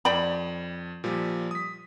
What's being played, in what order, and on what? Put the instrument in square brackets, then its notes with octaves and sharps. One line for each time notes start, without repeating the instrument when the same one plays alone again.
[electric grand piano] F2 [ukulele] D5 G5 B5
[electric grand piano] A#2 F3 G3
D#6 B6